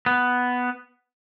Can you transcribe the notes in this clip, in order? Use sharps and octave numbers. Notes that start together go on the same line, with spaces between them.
B3